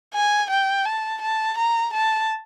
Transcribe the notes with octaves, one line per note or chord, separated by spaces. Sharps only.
G#5
G5
A5
A5
A#5
A5